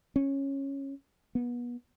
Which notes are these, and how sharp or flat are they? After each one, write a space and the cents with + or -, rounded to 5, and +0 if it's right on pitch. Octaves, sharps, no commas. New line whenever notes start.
C#4 -10
B3 -30